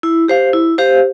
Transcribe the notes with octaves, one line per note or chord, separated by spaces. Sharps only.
E4
G4 C5 F5
E4
G4 C5 F5